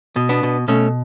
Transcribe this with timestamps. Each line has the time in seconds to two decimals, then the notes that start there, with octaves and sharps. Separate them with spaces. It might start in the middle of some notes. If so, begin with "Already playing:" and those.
0.16 B2
0.29 B3 D4
0.43 B2
0.68 B2 A3 C#4